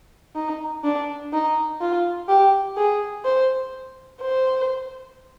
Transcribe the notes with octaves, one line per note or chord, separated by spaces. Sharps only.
D#4
D4
D#4
F4
G4
G#4
C5
C5